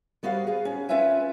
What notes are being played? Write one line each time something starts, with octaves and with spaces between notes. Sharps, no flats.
G3 B3 F#4 C5 F5
B3 G#4
C#4
C4 C#4 F4 B4 E5 G#5